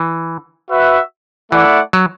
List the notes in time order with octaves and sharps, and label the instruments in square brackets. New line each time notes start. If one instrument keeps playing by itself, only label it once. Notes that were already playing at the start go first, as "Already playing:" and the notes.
Already playing: [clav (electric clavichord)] E3
[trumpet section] F#4 B4 E5
[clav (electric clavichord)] E3 [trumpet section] A3 E4 D5 F#5
[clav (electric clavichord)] F#3